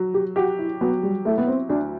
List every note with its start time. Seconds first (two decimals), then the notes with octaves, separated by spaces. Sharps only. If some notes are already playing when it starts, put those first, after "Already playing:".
Already playing: F#3
0.14 G4
0.36 F#4 G4
0.58 E4
0.81 F#3 B3
1.03 G3
1.25 A3 E4
1.38 B3
1.47 C4
1.69 D2 D4